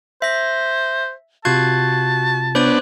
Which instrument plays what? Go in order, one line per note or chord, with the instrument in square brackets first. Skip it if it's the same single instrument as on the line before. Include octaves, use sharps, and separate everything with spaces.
[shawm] C5 [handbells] E5 A#6
[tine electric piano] C3 F4 [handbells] F#4 F#6 G#6 [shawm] A5
[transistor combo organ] B3 D4 [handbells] C5 C#5 F#6